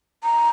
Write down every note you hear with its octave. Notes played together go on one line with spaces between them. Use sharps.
A#5